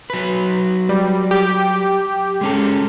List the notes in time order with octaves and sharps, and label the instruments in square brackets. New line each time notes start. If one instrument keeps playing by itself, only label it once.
[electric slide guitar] F#3 B4
[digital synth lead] G3
G4
[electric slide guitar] G#3 C#4 A4